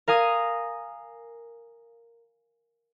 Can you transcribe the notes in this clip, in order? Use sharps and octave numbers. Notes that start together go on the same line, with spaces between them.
A#4 F5 G#5 D#6